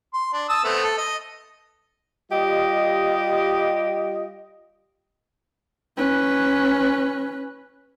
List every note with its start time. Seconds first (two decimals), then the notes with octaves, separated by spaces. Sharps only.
0.14 C6
0.33 D4
0.49 A5 D#6 E6
0.64 A3 B3 C4
0.83 A4
0.98 D#5
2.32 G3 F4 G4 D#5
5.97 C#4 B4